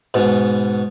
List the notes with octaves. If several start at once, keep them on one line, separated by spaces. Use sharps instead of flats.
G#2 B2